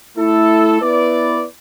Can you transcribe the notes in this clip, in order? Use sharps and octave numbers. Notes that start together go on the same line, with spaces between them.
A3 E4 A4
B3 E4 B4 D5